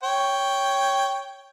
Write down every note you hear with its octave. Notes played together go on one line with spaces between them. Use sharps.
C#5 G5